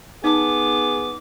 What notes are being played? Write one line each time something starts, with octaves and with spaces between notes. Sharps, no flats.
B3 D#4 G#4 B4 A5 D6